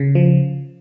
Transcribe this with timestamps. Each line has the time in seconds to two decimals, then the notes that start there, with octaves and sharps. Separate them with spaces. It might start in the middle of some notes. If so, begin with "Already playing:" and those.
Already playing: C#3
0.15 F3